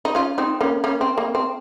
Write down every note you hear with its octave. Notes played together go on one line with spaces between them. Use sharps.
D#4
C#4 F4
C4 D#4
A#3 C#4
A#3 C#4
C4
A#3
C4